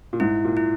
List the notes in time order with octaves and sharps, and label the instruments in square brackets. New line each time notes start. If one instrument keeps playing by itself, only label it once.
[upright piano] A#2
[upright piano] G#2 [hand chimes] E4
[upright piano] A#2
[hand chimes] E4